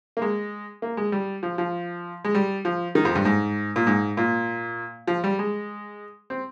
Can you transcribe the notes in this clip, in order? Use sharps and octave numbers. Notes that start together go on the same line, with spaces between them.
A#3
G#3
A#3
G#3
G3
F3
F3
G#3
G3
F3
D#3
F2
G2
G#2
A#2
G#2
A#2
F3
G3
G#3
C4